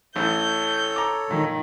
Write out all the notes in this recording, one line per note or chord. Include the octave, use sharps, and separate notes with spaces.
A1 E3 A4 C#5 A5 G6
A#5 D6
A#2 D#3